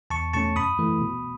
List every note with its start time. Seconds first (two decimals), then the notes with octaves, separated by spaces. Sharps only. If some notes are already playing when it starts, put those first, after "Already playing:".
0.10 E2 A5 C#6
0.33 B2 A3 C#4 A5 C#6
0.56 F#2 B5 D#6
0.79 E3 A3
1.01 B2